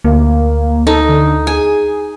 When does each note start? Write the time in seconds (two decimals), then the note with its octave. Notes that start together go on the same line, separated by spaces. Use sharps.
0.04 D2 A#3
0.87 D#4 A4
1.09 D3
1.47 G#4 G#5